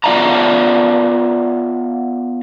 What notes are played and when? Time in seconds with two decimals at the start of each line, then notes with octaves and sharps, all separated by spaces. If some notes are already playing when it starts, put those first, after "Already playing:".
0.04 B3 F4 D5 E5 A5 A#5